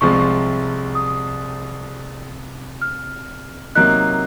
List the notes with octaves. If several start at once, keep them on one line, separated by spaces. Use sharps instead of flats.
C2 C3 F3 G#3 C4 C#6
D#6
F6
C3 F#3 A#3 D#4 F#6